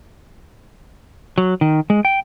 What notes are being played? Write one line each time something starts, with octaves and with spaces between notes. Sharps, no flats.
F#3
D#3
G#3
G5